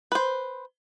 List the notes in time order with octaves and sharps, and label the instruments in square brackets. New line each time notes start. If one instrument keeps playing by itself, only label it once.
[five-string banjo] B4 C5